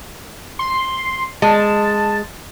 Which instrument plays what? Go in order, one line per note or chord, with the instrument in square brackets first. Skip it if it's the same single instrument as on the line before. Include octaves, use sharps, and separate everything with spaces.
[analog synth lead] C6
[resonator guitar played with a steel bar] G#3 [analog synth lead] A5